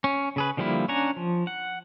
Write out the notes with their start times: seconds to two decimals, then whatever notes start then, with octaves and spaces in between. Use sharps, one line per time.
0.04 C#4
0.36 C#3 G#4 B4
0.57 D3 F3 G3 A#3 E4
0.88 C#4 D4 F#5 G#5 A#5
1.16 F3
1.47 F#5